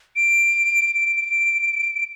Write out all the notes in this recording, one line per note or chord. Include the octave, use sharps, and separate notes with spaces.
D7
D7